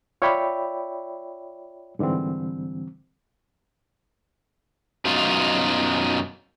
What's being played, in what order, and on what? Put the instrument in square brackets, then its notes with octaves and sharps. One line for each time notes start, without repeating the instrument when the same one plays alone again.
[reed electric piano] F4 C#5 D5 E5 G5 B5
G#2 D3 E3 G3 C4
[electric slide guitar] F#2 B2 D#4 F4